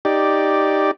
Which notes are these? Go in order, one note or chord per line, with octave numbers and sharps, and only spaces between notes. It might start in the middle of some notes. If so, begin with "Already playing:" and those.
D#4 G4 D5